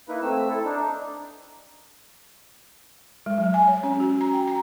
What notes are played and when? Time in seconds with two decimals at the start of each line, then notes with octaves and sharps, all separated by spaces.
0.09 A#3 D#4 E4 B4
0.22 A3 C4 E6
0.49 E4 A4
0.65 D4 D#4
3.26 G#3
3.38 F#3
3.54 G#5
3.68 C#5
3.83 C#4
4.00 F#4
4.21 A#5
4.33 G5
4.48 A#5